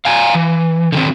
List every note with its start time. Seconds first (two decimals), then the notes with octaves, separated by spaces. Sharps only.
0.05 F5 G#5 A#5
0.34 E3
0.92 D3 D#3 C4